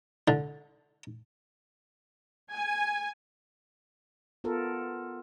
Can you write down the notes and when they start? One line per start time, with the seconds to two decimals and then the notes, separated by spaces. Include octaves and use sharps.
0.28 D3
2.51 G#5
4.44 B3 F4 A4 A#4